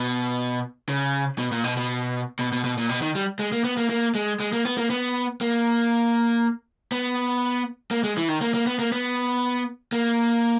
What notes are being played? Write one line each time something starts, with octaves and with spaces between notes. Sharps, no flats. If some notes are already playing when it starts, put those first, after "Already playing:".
Already playing: B2
C#3
B2
A#2
B2
B2
B2
B2
B2
A#2
B2
D#3
G3
G#3
A#3
B3
A#3
A#3
G#3
G#3
A#3
B3
A#3
B3
A#3
B3
A#3
G#3
E3
D#3
A#3
A#3
B3
A#3
B3
A#3